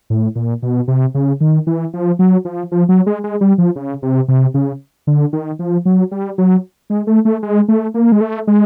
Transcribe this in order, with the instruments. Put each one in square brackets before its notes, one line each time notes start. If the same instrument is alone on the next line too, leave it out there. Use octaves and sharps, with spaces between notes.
[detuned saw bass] A2
A#2
B2
C3
C#3
D#3
E3
F3
F#3
F3
F3
F#3
G#3
G#3
G3
F3
C#3
C3
C3
C#3
D3
D#3
F3
F#3
G3
F#3
G#3
A3
A3
G#3
A3
A#3
G#3
A3
G#3